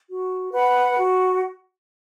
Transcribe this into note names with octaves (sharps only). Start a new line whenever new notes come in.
F#4
B4 F#5 B5
F#4